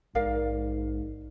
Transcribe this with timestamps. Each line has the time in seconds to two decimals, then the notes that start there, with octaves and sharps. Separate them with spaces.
0.15 A#1 G#2 A#4 D5 F5